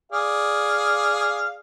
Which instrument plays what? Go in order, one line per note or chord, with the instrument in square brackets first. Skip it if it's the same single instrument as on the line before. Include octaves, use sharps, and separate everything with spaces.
[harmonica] G#4 D5 F5